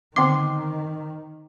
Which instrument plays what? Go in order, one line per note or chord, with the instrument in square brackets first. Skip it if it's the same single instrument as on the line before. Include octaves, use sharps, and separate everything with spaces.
[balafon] D3 B3 C4 [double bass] D#3 [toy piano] C5 G5 D6 [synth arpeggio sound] C6